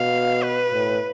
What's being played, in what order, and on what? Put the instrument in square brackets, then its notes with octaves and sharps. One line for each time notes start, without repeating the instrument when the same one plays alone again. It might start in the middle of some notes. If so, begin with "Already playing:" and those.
Already playing: [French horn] B2 [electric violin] F5
[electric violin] B4
[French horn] A2